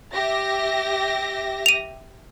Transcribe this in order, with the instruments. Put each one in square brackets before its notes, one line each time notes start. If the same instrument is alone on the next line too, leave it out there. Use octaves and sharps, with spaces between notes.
[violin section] G4 E5 A#6
[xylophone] D#7 F7